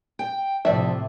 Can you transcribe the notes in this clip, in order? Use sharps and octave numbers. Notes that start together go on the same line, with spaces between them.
G5
A2 C3 F3 D5 E5